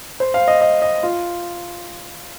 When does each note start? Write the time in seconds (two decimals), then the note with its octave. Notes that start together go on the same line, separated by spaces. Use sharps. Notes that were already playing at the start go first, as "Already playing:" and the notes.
0.20 C5
0.34 F5
0.48 D#5
0.61 D#5
0.82 D#5
1.03 F4